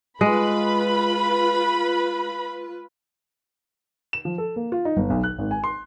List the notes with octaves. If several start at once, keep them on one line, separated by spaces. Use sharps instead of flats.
G#3 F4 B4 B5
E7
F3
A4
A#3
F4
D#4
G1
B1
F#6
G#1
G#5
C6